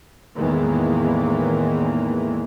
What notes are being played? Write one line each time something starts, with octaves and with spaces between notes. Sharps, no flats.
E2 A2 D#3 E3 G#3 A#3